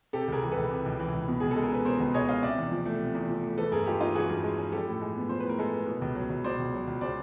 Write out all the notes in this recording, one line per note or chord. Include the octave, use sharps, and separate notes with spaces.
C3 G4 A4
C#2 G#4 A#4
E3
C#2 A4 B4
C3
C#2
E3
C#2
B2
C#2 G#4
A4
G#3
A#4
C#4 B4
B2 A#4 C5
C#2
G#3 C#5 D#5
C#4 D#5 F5
C3 D5 E5
E2
F3
A3
C3
E2
F3
A3
E3 A4 B4
G2 G#4 A#4
G#3 F4 G4
C#4 D#4 F4
E3 F#4 G#4
G2
G#3
C#4
F3 G4 A4
A2
G#3
B3
F3 C5
A2 B4
A#4
G#3 A4 B4
B3
B2
C#2
F#3
C#2
B2 C5 D5
C#2
F#3
C#2
C#3 C5 D5